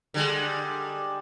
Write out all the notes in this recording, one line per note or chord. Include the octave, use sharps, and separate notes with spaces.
D3 G3 G#3